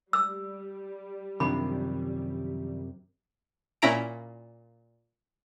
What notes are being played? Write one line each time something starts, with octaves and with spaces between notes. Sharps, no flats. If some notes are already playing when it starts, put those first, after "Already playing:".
G3 E6
F#2 C3 D#3 F3 D4 B5
A#2 C#4 E4 A#5 D7